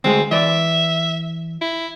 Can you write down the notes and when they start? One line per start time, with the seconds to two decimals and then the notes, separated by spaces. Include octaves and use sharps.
0.04 D2 G#3 C4 G#4
0.31 E3 D5 E5
1.61 E4